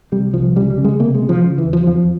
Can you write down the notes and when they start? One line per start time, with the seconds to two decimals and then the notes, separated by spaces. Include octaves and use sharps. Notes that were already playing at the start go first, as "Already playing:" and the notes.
0.12 C3 G3
0.33 C2 F3
0.56 C#3 G3
0.70 G3
0.78 C#3
0.84 G#3
0.99 C3 A#3
1.14 G#3
1.22 C3
1.29 F3
1.44 C#3
1.58 E3
1.66 E2
1.73 F3
1.87 F2 F3